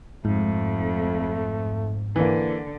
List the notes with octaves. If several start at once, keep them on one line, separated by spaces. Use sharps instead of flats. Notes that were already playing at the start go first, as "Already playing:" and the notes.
F2 G#2 A3
D3 E3 A#3